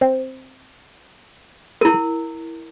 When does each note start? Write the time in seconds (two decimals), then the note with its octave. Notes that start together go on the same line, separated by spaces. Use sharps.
0.01 C4
1.81 E4 A#4